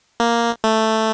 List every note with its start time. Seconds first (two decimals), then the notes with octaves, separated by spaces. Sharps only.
0.20 A#3
0.64 A3